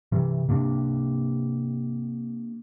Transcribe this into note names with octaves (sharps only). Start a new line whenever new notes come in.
C3 E3
C3 A#3 C4 D4